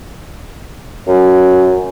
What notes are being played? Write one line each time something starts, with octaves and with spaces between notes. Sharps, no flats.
F#2